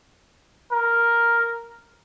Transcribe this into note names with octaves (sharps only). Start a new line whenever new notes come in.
A#4